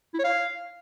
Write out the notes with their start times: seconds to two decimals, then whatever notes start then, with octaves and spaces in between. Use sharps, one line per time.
0.14 E4
0.19 C#5
0.24 F5